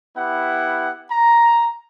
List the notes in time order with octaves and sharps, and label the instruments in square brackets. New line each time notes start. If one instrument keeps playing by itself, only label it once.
[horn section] B3 E4 G4 F#5
A#5